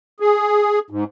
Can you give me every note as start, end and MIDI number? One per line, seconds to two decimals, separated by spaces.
0.20 0.79 68
0.90 1.04 44